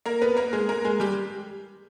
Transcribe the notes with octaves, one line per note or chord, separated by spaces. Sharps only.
A#3 A#4
B3 B4
A#3 A#4
G#3 G#4
A#3 A#4
G#3 G#4
G3 G4